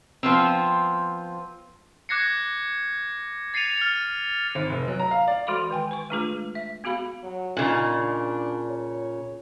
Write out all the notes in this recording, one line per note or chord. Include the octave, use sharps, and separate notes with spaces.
F3 B3 C4
D6 F#6 G#6 A#6 C7 C#7
A6 C7 C#7 D#7 F7
F6 A6 C#7
G#1
F1
F#3
A#5
F5
D5
E3 G#3 F#4 A4 B5 D6
D#3 G5 G#5
B4 C#6
G#3 A3 D4 F4 G#4 B4
E5
B3 F#4 G#4 F5 B5
F#3
A#2 C#3 D#4
D4
C#5